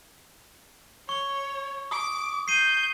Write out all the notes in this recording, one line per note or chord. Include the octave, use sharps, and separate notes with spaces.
C#5 C#6 G7
D6 D#6
G6 C7 D#7